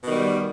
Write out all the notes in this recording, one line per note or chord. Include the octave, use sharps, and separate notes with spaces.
B2 D#3 G3